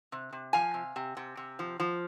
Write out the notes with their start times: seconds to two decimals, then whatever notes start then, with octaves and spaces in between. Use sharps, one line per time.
0.12 C3
0.33 C3
0.53 F3 F5 G#5
0.74 C3
0.96 C3
1.17 C3
1.37 C3
1.59 F3
1.80 F3